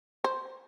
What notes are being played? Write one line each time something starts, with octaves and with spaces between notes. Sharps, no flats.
C5